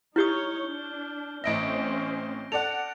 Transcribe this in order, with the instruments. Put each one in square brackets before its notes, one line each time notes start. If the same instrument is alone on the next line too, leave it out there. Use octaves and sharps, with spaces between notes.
[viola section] D#4 C#5 [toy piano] E4 G4 D#6 [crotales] F6 G6 G7
[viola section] D4
[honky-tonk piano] A1 D#5 E5 [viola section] C4 C#4 C5 [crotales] A#6 D7
[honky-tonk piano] A4 D5 F#5 [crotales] F7